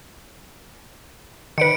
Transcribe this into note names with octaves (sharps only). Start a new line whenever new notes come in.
D#3 B4 C#7 D7